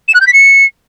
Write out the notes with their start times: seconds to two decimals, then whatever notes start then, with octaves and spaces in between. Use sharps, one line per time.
0.08 E7
0.14 F#6
0.21 G6
0.27 B6
0.33 C#7